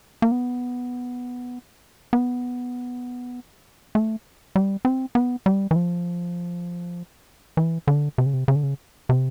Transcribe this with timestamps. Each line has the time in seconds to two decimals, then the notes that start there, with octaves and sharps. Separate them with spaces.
0.22 A#3
0.32 B3
2.13 B3
3.95 A3
4.56 G3
4.85 C4
5.15 B3
5.46 G3
5.71 E3
5.76 F3
7.57 E3
7.88 D3
8.18 C3
8.26 C#3
8.33 C3
8.48 C#3
8.55 D3
8.63 C#3
9.09 C3